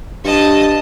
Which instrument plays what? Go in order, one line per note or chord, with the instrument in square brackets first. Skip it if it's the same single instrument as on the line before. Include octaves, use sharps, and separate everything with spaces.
[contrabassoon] G2 [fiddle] D#5 A5